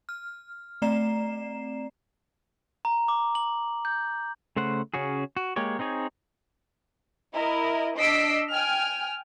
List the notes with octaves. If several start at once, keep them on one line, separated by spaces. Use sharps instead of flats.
F6
A3 C4 D5 A#5 C7 E7
A#5
D6
F#7
G6
C#3 A3 C5 F#5
C#3 C#4 F#4 G#4
F#4
G#3 A#3 G4 C#5
C4 D#4 G#4 C#5
E4 A#4 D#5
D4 D#5 E6 B6 C7 D7
G5 G#5 F6